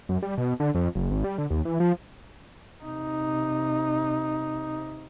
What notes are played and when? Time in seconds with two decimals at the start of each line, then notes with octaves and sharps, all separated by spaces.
0.09 F#2
0.22 G3
0.37 B2
0.60 D3
0.75 F2
0.95 F#1
1.11 G#1
1.24 G3
1.38 D3
1.50 D#2
1.65 E3
1.80 F3
2.83 C3 D#4